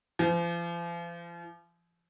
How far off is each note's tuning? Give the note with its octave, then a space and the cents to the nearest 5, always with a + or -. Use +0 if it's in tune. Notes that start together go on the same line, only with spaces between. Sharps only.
F3 -40